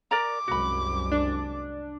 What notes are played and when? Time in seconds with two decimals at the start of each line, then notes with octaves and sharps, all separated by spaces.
0.11 A#4 D5 A#5 D6
0.48 C2 F#2 G#3 F#4 B5
1.12 D4